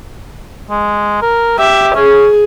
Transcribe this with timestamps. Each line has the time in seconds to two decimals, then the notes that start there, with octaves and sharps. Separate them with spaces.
0.70 G#3
1.22 A#4
1.59 G4 E5
1.95 C#4 G#4